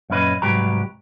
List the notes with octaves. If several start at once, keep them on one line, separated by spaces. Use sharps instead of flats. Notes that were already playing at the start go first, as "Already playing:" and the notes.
F#2 A#2 C#4 B4 D#5
C2 G#2 F#3 G4 B4 A#5